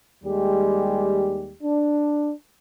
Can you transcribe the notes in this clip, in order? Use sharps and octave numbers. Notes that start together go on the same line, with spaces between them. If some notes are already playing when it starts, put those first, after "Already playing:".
D#2 G3 G#3 G4
D4